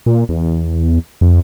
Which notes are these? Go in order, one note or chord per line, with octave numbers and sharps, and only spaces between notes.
A#2
E2
F2